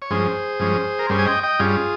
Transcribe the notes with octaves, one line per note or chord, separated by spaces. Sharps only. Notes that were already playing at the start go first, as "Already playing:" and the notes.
C#5
G2 F3 G#3 C#4 G#4 C5
G2 F3 G#3 C#4
A#4
G2 G3 C#4 G#4 C5
G#5
D#5 G5
D#5 G5
G2 G3 C#4 F4 G#4